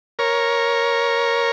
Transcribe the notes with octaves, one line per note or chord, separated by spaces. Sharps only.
A#4 C#5